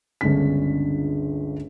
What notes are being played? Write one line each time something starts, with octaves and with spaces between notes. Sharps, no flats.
G1 C#2 D3 C#4 D4 B6